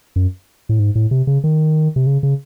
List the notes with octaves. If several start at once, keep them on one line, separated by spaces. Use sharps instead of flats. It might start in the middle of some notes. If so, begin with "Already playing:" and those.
F#2
A2
G#2
A2
C3
C#3
D#3
C3
C#3
C#3